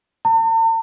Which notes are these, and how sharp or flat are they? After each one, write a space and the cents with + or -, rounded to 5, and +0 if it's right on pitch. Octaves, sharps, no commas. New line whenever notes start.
A5 +45